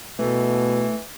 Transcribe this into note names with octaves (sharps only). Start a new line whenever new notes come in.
B2 E3 A3